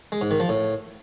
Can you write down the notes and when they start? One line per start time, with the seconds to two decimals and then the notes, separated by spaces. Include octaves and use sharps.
0.12 G#3
0.21 G#2
0.31 D#3
0.40 F3
0.49 A2